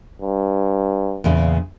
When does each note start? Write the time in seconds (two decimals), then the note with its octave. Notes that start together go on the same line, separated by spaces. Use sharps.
0.22 G2
1.24 E2 A#2 C#3